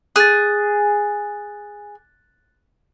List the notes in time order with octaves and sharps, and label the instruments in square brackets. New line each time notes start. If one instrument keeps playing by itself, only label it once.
[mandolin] G#4 [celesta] F#6 A6